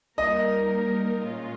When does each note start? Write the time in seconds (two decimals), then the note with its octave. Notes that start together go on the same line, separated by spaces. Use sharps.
0.18 G3 A#3 D#4 A#4 D#5
1.24 A#2 G#3 C#4 F4